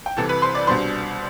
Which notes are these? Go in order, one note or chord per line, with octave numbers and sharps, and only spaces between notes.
G5
C2 C3 E3 A4 A5
B4 B5
C5 C6
D5 D6
C2 B2 G3 D4 C5 C6